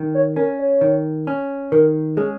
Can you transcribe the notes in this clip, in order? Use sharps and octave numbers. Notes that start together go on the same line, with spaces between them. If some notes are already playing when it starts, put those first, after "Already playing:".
Already playing: D#3
C#5
C#4 A#4
C#5
D#3
C#4
D#3 A#4
G#3 C#4 G#4